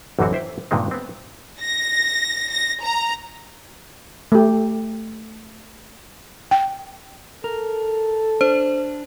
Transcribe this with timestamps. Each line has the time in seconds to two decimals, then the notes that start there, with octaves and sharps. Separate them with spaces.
0.19 A1 F#2 D3 E3 C4 F#4
0.33 E4 C5 E5 G5
0.71 G2 A#2 D3 D#3 G#3 C4
0.91 B3 C4
1.61 A#6
2.51 A#6
2.82 A#5
4.32 A3 G4
6.51 G5
7.44 A4 A#4
8.41 D4 C5